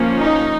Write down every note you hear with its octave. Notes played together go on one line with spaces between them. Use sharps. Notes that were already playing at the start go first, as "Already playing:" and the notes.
Already playing: F3 A#3 C#4
D#4